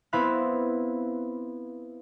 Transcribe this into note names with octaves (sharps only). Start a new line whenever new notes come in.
B3 C4 E4 F5 B5 F#6